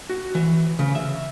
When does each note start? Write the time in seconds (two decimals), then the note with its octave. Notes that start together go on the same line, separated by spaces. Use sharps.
0.10 F#4
0.35 E3
0.79 C#3
0.95 E5